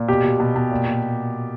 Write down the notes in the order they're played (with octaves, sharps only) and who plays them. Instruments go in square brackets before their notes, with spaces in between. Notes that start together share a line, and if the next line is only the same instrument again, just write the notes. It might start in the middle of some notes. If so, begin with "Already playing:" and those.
Already playing: [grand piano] A#2
B2 G4
B2
B2
B2
A#2
A#2